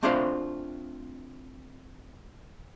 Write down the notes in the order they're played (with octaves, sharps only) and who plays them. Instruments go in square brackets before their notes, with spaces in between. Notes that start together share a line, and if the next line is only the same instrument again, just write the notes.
[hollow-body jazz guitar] A3 C4 D4 F4 C5 F5